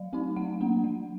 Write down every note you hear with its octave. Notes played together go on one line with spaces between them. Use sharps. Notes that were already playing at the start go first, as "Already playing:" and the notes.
Already playing: F#3 F5
A3 C4 D#4
F#3 F#5
A#3 D4
F#3